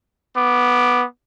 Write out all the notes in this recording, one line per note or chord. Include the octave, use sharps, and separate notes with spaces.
B3 D6